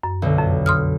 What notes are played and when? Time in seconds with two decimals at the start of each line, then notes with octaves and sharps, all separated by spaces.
0.03 F#2
0.22 B1 D3
0.38 F2
0.66 C6 D#6 F6